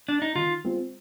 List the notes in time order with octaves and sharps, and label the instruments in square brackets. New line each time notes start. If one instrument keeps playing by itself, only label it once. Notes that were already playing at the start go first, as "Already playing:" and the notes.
[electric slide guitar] D4
D#4
[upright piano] D#3 [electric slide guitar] F4
[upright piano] G#3 C4 F4